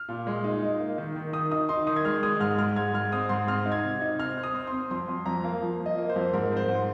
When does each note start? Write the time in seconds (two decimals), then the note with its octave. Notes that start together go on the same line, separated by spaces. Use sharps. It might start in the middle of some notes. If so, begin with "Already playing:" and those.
Already playing: F6
0.09 A#2
0.27 G#3
0.44 D#4
0.63 D#4
0.79 A#3
0.98 D#3
1.16 D#3
1.33 D#3 D#6
1.52 D#4 D#6
1.69 D#4 C6
1.87 D#3 D#6
1.96 G#6
2.05 G#3 F6
2.23 G#3 D#6
2.40 G#2 F6
2.59 G#3 F6
2.76 G#2 G#6
2.94 G#3 F6
3.12 C4 D#6
3.29 G#2 C6
3.47 C4 F6
3.65 D#4
3.72 G#6
3.84 C3
4.01 D#4
4.18 C4 F6
4.37 C4
4.43 D#6
4.54 C4
4.67 C6
4.72 C4
4.91 F2 C6
5.09 F2
5.26 F2 A#5
5.44 A#3
5.62 F3
5.80 F3
5.86 D#5
5.98 A#3
6.10 C5
6.16 F2
6.33 G#2 A#4
6.52 C4 C5
6.69 G#2